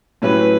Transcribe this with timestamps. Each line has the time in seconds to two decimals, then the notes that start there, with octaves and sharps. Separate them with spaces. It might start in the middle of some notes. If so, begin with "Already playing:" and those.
0.22 A2 F#3 C#4 E4 G4 B4